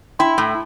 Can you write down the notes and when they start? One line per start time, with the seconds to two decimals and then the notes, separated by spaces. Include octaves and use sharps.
0.19 E4 G5 C6
0.38 A2